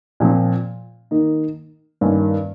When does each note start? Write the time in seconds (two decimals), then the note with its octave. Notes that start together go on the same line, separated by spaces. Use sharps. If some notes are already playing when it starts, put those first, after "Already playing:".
0.20 A#2 F3 C4
1.11 D#3 A#3 D#4
2.01 G2 D#3 A#3 C#4